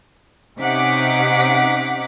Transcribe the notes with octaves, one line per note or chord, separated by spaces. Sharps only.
C3 C#4 D#4 F#5 D6 B6